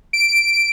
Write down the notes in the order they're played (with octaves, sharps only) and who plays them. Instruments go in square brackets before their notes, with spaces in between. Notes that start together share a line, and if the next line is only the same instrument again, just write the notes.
[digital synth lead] D7